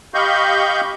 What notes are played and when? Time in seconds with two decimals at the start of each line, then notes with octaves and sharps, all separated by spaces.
0.14 G4 D#5 F5 B5 C#6 G6